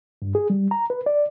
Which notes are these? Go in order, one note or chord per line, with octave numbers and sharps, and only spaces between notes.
G2
G#4
G3
A#5
B4
D5